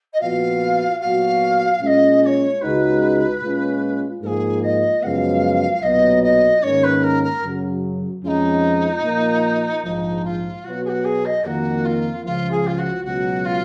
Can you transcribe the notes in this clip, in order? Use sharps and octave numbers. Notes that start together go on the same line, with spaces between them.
D#5
A#2 F3 B3 F#4 F5
A#2 F#3 B3 F#4 F5
A#2 G#3 C#4 D#5 F5
D#5
C#5
C#2 C#3 G#3 D#4 F#4 B4
A#2 G#3 C#4 F4
G#2 F3 A#3 F4 G#4 A#4
D#5
F#2 C#3 F3 G#3 B3 F5 F#5
B1 A#2 F#3 B3 D#5
D#5
G#2 D#3 A#3 C#4 C#5
B4
A#4
A#4
F#2 C#3 F#3
F2 F3 G#3 C#4 D#4 F4
A#2 F3 A#3
A#1 G#2 F3 D#4
F4
B2 F#3 B3 F#4
G#4
F#4
G#4
D#5
F2 D#3 A#3 F#4
F4
C#2 C#3 F3 F4
G#4
F4
F#4
C#2 B2 F#3 F#4
F4